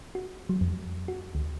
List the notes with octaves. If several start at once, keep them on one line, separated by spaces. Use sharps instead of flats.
F#4
F#3
F2
F#4
D2